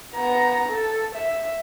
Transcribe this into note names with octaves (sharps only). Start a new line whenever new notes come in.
B3 A#5
A4
E5